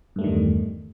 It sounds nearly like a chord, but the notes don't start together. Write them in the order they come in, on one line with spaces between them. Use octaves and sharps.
G2 A3 G3 D#3 E2